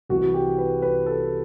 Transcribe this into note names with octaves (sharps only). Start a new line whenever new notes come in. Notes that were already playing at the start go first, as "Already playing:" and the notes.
C2 C3 E3 F#4
G4
B4
B4
A4